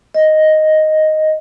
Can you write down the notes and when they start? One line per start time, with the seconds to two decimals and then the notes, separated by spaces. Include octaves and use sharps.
0.14 D#5